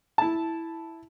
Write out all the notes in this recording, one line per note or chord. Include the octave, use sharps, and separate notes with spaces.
E4 A5